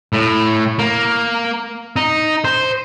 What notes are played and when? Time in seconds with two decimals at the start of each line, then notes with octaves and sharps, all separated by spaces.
0.13 A2
0.79 A#3
1.96 D#4
2.44 C5